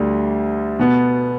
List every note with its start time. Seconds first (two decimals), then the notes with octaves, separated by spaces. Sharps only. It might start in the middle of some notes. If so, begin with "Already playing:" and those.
Already playing: D2 D3 G3
0.79 B2 B3